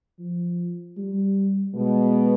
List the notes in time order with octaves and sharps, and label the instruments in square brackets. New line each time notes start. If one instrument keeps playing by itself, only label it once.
[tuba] F3
G3
[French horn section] B2 [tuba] G#3